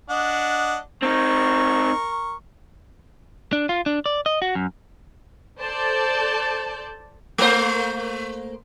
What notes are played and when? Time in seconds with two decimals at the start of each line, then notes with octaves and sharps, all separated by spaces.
0.10 D4 D#5 F#5
1.03 C4 D#4 A#4 C#6
3.53 D4
3.69 F4
3.86 D4
4.06 D5
4.26 D#5
4.42 F#4
4.55 F#2
5.61 A4 C5 D5 A5 G6
7.38 A3 A#3 C5